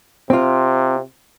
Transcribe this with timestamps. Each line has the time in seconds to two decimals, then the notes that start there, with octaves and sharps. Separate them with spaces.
0.30 C3 C4 F4